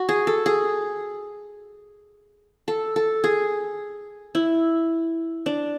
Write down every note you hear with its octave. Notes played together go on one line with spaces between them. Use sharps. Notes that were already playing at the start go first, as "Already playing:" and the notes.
Already playing: F#4
G#4
A4
G#4
A4
A4
G#4
E4
D4